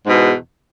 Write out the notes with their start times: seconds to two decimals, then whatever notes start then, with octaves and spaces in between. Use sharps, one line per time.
0.04 G#2
0.08 B2
0.12 E2